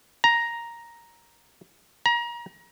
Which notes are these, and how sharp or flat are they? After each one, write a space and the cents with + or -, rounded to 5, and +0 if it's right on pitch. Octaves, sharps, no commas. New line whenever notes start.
A#5 +5
A#5 +30